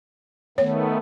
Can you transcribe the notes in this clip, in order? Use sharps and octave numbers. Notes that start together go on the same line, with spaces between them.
D#3 A3 B3 C#5